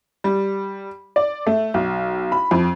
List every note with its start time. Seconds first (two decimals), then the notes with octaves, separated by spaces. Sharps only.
0.24 G3
1.16 D5
1.46 A3
1.74 B1
2.32 B5
2.51 F2